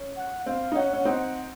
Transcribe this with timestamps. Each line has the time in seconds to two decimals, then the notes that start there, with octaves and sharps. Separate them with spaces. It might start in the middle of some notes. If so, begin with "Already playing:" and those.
Already playing: C#4
0.17 F#5
0.46 C4 F5
0.72 D#4
0.76 C#4 F#5
0.93 C#4
1.05 C4 D#4 F#5